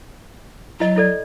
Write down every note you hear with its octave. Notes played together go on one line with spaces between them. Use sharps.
F#3 E4 D#5
E4 A4 D5